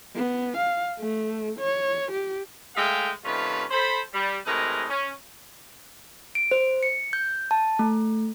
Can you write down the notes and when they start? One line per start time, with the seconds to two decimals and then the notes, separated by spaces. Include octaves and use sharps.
0.15 B3
0.57 F5
0.99 A3
1.60 C#5
2.12 G4
2.76 G#3 A3 G#4 E5 F5 G5
3.24 C3 D#3 A3 C#4 F4 B4
3.71 A4 C5 B5
4.14 G3
4.46 A2 C3 G#3 A#4 B4 D#5
4.89 C#4
6.35 D7
6.51 C5
6.83 C#7
7.13 G6
7.51 A5
7.79 A3